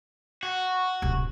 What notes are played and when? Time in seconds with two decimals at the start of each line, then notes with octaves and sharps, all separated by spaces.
0.43 F#4
1.02 D1 C2